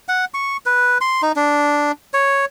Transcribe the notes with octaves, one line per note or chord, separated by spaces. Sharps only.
F#5
C#6
B4
C6
D#4
D4
C#5